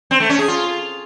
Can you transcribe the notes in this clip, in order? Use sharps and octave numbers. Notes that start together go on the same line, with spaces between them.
C4
A3
C#4
G#4
F4